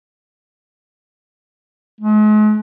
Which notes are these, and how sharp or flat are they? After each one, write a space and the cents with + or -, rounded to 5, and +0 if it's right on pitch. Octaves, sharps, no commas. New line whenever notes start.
G#3 +40